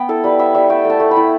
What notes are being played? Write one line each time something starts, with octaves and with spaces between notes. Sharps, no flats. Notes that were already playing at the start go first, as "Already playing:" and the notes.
Already playing: B3 G5
E4 A4
G3 B4
B3 E5
G3 E5
A3 G5
A3
A5
A3
B5
E4